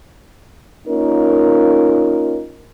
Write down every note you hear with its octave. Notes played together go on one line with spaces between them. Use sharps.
A#3 C#4 D#4 F4 A#4